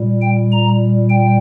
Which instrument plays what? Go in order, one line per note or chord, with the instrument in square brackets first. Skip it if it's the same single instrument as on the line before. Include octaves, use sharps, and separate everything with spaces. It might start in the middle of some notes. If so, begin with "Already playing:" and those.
Already playing: [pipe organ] A#2 G3
G5
A#5
G5